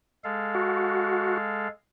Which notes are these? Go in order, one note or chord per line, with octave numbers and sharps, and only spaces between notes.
G#3 A4 F5
F#4